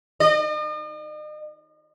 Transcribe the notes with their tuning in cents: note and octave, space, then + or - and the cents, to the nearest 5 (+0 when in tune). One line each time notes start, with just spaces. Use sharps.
D#5 -40